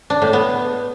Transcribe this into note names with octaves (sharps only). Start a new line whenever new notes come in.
D4
A2
B3